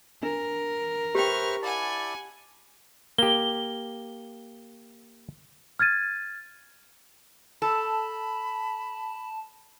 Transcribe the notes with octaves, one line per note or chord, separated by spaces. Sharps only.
D4 A#4
G4 B4 C5 E5 G5 C#6 F6
E4 D5 F#5 G#5 A5
A#3 G4 G7
F6 G#6 A6 D#7
A4 A5 B5